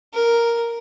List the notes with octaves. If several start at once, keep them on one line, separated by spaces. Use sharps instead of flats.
A#4